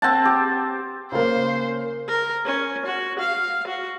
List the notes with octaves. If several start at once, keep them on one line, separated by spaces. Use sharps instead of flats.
C4 F#5 A5
G4
C#3 A#3 C5
A#4
C#4
F#4
F5
F#4